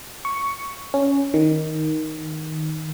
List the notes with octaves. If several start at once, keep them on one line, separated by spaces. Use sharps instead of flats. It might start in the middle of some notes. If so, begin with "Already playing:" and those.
C#6
C#4
D#3